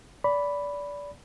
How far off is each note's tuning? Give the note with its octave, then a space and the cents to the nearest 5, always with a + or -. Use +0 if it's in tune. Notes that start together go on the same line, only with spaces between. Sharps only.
D5 -25 B5 +0